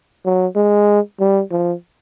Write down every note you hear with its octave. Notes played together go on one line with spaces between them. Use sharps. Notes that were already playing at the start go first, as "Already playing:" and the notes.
F#3
G#3
G3
F3